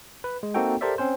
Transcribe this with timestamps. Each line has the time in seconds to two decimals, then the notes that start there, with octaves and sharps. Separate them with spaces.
0.24 B4
0.43 G#3
0.54 A#3 C4 D#4 F#4 A4 G5
0.81 G4 A4 A#4 C5 D5 E5
0.98 C4 C#4 C5